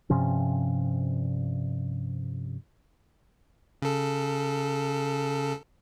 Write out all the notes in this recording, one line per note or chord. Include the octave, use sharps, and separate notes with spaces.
G2 C3 F3 C#4
C#3 A4